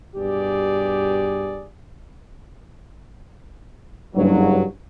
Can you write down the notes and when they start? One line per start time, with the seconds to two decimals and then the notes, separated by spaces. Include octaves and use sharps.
0.16 G2 B2 G4 G#4 D5
4.15 F#1 G2 F#3